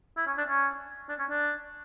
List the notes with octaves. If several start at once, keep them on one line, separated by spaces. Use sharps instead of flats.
E4
C#4
D4
C#4
D4
C#4
D4